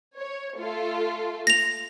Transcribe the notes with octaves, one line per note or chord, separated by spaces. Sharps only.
C#5
A3 F4 A4
A#6 F7